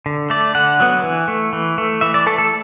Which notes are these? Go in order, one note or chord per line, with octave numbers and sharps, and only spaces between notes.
D3
A3 D5
D3 F#5
F#3 B3
E3
A3
E3
A3
E3 E5
D5
A3 A4
A4